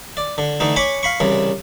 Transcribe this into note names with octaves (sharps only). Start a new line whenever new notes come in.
D5
D3
D3 E3 A3 D#4
C#5 G#5 B5 C#6 D6
F5 B5 C#6
C2 C#3 E3